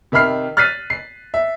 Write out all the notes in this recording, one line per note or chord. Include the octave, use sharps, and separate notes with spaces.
C3 D#3 E5 B5 F6 C7
F6 F#6 A6 B6 C7 D#7
C7
E5